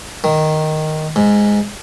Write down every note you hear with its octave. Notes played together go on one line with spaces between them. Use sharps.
D#3
G#2